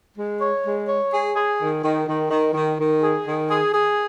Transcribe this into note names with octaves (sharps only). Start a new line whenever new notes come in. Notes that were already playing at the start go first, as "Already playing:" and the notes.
G#3
C#5
G#3
C#5
G#4
G#4
D#3
D#3
D#3
D#3
D#3
D#3
G#4
D#3
G#4
G#4